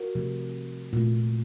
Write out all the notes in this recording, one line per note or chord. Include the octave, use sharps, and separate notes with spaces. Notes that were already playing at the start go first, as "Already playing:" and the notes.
Already playing: F#4 A#4
C3 F3 A3
A#2 A3